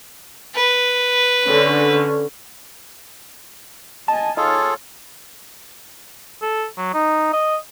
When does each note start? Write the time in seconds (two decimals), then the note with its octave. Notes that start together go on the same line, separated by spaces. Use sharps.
0.55 B4
1.45 D3 C#4
4.08 D#5 G#5 A5
4.37 D#4 F4 G#4 A4 C#5 F5
6.42 A4
6.78 F#3
6.94 D#4
7.33 D#5